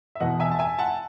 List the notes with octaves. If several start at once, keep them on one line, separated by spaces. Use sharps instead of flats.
E5
E2 B2 D#5 F#5
E5 G#5
A5
E5 G#5
F#5 A5